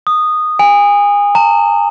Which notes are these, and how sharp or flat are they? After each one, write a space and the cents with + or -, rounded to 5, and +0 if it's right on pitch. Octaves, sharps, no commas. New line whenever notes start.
D#6 -10
G#5 -30
A#5 -40